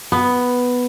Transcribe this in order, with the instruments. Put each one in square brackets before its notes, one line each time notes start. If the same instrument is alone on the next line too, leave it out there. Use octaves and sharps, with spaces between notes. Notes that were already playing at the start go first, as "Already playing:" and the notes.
[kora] B3